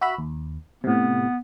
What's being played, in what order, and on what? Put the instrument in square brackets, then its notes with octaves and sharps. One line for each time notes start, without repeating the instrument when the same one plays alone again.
[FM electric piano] F#4 E5 B5
D#2
[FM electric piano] A2 C3 [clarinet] B3